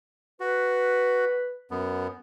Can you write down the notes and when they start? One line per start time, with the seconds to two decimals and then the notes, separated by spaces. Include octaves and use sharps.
0.40 F#4 B4
1.71 F#2 B3